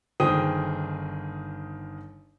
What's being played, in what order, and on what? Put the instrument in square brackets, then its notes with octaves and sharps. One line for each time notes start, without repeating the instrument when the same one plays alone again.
[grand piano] G1 D#3 G#4 C5 G5 D#6